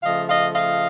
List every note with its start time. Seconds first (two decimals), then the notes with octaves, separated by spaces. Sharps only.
0.03 C#3 F3 A3 D#5 F5
0.29 D#5 F5
0.55 D#5 F5